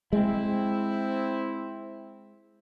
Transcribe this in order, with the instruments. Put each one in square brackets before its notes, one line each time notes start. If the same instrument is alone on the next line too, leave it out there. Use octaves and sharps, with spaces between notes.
[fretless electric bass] G#3 [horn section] C4 E4